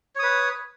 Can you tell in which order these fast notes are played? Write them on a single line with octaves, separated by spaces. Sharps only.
C#5 D#6 B4